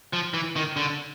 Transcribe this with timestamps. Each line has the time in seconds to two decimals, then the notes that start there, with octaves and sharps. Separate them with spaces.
0.13 F3
0.34 E3
0.56 D#3
0.76 D3